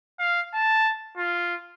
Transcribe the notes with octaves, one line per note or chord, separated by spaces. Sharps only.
F5
A5
F4